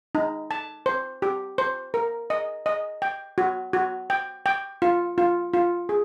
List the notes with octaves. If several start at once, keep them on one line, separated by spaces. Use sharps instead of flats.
D#4
A5
C5
G4
C5
A#4
D#5
D#5
G5
F#4
F#4
G5
G5
F4
F4
F4
G#4